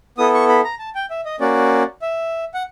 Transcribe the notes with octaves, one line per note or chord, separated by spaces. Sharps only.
B3 E4 A4 D#6
C#6
B5
A#5
A5
G5
E5
D#5
A#3 C#4 F#4 D5
E5
F#5